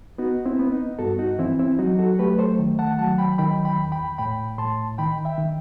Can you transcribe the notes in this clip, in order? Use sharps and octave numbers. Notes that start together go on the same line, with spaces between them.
B3 D#4 F#4
C4 E4
B3
D#4
G2 F#4 A4
D#4 F#4
E3 C4 E4
C4 E4
F#3 D#4 F#4
F#4 A4
A3 G4 B4
A4 C5
D#3
F#5 A5
F#3 F#5 A5
G5 B5
D#3 G5 B5
G5 B5
E2
G5 B5
A2 G5 B5
A2 A5 C6
D#3 G5 B5
E5 G5
D#3